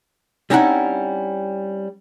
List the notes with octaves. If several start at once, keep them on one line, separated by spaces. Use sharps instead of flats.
G3 C4 C#4 D#4 E4 F#5